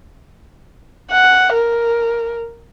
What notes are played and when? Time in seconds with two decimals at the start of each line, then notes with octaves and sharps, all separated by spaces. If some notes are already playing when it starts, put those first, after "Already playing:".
1.11 F#5
1.53 A#4